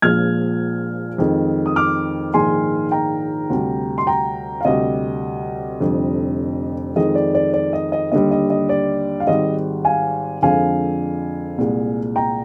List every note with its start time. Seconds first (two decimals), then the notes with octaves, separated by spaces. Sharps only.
0.02 A#1 A#2 F3 G#3 F6 G#6
1.18 F2 D#3 G#3
1.66 D#6
1.76 D6 F6
2.34 A#1 G#2 D#3 G#3 G#5 C6
2.91 G5 A#5
3.50 D2 C3 G3
3.98 C6
4.07 G5 A#5
4.61 F5
4.65 D2 C3 G3 D#5
5.81 F1 F2 D3 G3
6.96 F2 D#3 G#3 D#5
7.15 D5
7.34 D5
7.53 D5
7.73 D#5
7.92 D#5
8.12 D#2 D3 G3 D#5
8.31 D#5
8.50 D#5
8.69 D5
9.20 F5
9.27 G#1 G#2 G3 D#5
9.85 F5 G#5
10.42 F2 D3 F3 G#3 F5 G#5
11.58 C2 A#2 G#3
12.16 G5 A#5